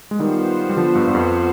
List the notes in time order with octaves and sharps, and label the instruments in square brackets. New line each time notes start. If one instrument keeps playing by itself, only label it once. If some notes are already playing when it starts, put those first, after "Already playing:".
[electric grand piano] G#3
[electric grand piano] D#3 G3 [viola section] B3 F4 C5
[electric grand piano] G3
D3 F3
G2
G2
F2